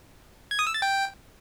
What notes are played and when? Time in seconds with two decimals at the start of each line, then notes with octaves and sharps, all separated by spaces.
0.51 G#6
0.59 D#6
0.67 E6
0.74 A6
0.82 G5